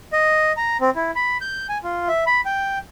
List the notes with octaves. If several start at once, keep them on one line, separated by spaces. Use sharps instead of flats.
D#5
A#5
C4
E4
B5
G6
G#5
F4
E5
B5
G5